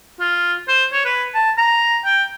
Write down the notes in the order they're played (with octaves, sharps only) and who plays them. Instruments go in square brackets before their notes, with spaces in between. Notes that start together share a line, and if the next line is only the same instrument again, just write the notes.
[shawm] F4
C5
C#5
B4
A5
A#5
G5